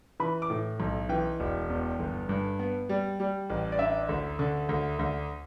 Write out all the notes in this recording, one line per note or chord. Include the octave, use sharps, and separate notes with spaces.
E3 B5
D6
A2
B1
E3 G5
E1
E2
G1
G2
B3
G3
G3
A1
D5
D4 E5
D2
D3
D2
D2